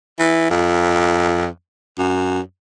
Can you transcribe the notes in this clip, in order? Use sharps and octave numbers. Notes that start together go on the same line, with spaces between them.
E3
F2
F#2